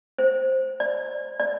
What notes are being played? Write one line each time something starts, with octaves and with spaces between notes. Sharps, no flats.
C5
D5
D5